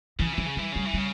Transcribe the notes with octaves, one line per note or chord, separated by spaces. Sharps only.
C#3 E3
E3 F3
C#3
E3 G3
C#3 G3
E3
C#3 G3